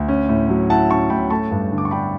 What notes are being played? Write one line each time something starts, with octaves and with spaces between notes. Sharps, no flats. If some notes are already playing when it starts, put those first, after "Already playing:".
Already playing: D2
C#4
A2
F#3
E4 F#5 A5
C#4 A5 C#6
A2 G5 B5
A3 A5 C#6
G2
D3
D6
C#6
D4 G5 B5